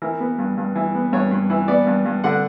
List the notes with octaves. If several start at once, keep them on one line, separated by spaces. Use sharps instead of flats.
E3 A#4
B3
G2
G2
E3
B3
G2 C#5
G2
E3
B3 D5
G2
G2
D3 F#5